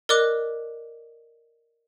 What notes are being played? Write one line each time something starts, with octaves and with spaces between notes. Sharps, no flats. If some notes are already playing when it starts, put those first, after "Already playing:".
A#4 D5 D#5 D6 F#6